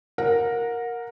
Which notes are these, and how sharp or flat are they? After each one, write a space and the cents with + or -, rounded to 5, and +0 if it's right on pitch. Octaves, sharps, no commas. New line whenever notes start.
A#4 +0 F#5 -30